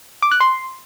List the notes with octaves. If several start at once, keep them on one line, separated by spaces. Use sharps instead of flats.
D6
F#6
C6